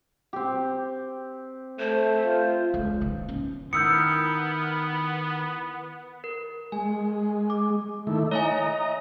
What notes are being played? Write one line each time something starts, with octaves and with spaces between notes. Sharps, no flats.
C4 G4
A3 C5
F4
C#2
D#3
C#4
D#3 B3 E4 A#4 D#6 E6 G6 C#7
A#4
G#3 G#5
D6
D#3 A3 E4
C#5 D#5 E5 G#5 A#5